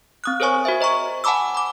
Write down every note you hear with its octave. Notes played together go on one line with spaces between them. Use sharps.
C4 D#6 F#6
G#4 A#4 C5 C#5 G#5 C#6
F#4 C5 E5
C5 D#5 A#5 C#6
F#5 G#5 A5 B5 D6 E6
B5 D6